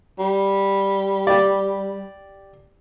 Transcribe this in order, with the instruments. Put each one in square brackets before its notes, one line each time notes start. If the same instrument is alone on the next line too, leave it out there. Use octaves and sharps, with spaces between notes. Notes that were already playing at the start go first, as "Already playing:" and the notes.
[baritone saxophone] G3
[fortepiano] G4 D5